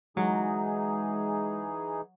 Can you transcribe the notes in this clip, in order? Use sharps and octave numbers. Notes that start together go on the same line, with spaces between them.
E3 F#3 G#3 D#4 G#4